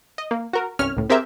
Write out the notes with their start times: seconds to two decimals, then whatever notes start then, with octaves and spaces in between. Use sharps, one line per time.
0.18 D#5
0.31 A#3
0.53 F#4 A#4
0.79 C2 G2 C#4 C#5 F6
0.97 C#2 A2
1.10 C4 G4 G#4 A#4 E5